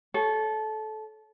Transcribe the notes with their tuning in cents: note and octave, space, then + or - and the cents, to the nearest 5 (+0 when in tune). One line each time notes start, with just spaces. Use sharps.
A4 -20 C#5 +0